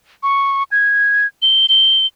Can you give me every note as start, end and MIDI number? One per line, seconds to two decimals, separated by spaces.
0.23 0.63 85
0.72 1.27 92
1.42 1.66 103
1.69 2.06 103